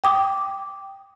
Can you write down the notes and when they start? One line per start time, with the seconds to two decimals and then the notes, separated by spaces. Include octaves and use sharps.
0.04 G5 D6 D#6